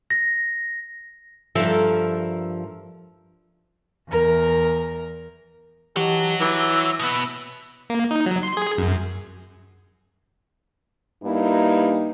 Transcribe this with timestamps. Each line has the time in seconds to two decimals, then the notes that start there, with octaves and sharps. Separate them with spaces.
0.10 A#6
1.55 G2 F3 A4 A#4 E5
4.08 E2 A#4
5.96 E3 G4 C#5 D#5 F#5 A5
6.41 E3 D6 E6
6.99 B2 B3
7.90 A#3
8.11 D#4
8.26 F#3
8.43 C6
8.57 G#4
8.78 F#2
11.24 G2 A#3 D#4 E4